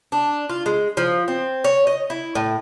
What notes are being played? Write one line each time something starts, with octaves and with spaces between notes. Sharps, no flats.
D4
F4
G#3
F3
C4
C#5
D#5
E4
A2